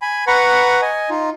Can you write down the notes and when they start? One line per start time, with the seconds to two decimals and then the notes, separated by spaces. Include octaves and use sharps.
0.02 G#5 B5
0.27 B4 F#5 A#5 B5 C#6
0.82 D#5 G#5
1.10 D#4 F4